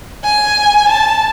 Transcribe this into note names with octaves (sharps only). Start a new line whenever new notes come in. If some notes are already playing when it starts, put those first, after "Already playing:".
G#5
A5